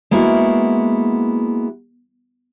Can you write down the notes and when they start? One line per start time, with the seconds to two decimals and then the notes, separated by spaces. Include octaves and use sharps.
0.11 G#3 A#3 B3 E4 F#4